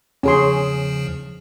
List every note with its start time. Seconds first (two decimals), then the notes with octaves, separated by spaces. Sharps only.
0.23 E2 C#3 F3 C#4 G#4 C6